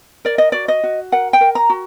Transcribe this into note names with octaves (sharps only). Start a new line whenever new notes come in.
A#4 D5
D#5
F#4 D5
D#5
F#4
A#4 F#5
G5
A#4
A#5
F#4